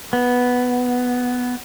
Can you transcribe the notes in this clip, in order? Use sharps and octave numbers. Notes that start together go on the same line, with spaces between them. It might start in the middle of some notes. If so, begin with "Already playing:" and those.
B3